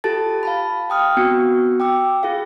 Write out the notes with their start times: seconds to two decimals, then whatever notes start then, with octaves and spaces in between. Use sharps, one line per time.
0.04 F4 G4 A4 A5 A6
0.43 F5 A5 B5
0.90 G5 D#6 F6
1.17 B3 C4 F#4 C#7
1.80 G5 D6 E6
2.23 F4 G#4 F5